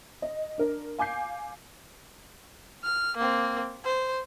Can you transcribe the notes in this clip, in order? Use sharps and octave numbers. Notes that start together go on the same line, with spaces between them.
D#5
D4 A#4
F5 G#5 D6 G6 C7
F6
A#3 C4
C5